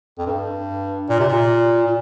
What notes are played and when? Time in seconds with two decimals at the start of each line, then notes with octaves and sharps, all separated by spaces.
0.18 F2
0.26 G2
1.09 A#2
1.19 C3
1.28 A#2
1.86 A#2